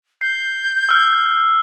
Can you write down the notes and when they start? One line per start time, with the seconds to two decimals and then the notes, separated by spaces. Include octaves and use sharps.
0.21 G6 C7
0.89 E6 F6